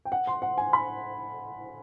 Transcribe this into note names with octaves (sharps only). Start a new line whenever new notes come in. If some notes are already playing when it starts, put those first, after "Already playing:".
G5
F#5
C6
F#5
G#5
B5